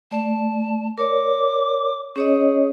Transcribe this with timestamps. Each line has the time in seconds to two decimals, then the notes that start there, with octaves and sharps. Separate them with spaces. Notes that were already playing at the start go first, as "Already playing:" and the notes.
0.11 A3 D5 A5
0.98 A#4 C#5 D5 D6
2.16 C#4 G#4 C#5 D#5